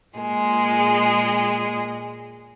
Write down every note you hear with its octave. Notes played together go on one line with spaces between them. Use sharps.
A#2 G#3